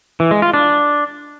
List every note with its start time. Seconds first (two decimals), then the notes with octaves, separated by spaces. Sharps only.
0.20 E3
0.31 G#3
0.42 F4
0.54 D4